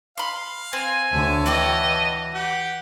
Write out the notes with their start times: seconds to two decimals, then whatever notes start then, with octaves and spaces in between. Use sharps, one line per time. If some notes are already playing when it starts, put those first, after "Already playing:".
0.18 F5 B5 C6
0.73 C4 G#5
1.12 D2 D3 C#5 E5 A5
1.46 E3 F#4 D5 D#5 G5
2.34 G4 F#5